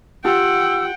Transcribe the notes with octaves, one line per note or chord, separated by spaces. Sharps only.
F4 G4 F#5 G5 E6